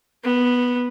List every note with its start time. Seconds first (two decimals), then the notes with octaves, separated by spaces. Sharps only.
0.24 B3